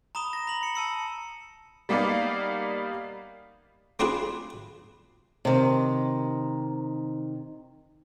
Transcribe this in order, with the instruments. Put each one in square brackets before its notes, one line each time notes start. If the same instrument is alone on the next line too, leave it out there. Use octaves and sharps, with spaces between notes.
[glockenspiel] A#5 B5 D#6 E7 G7
A#6 E7
B5 F#7
C#7
A5 E6 C#7
[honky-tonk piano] G3 A#3 B3 D#4 D5 F5
[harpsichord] A3 C4 D4 F4 G#4 B4
[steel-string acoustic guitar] C3 D#3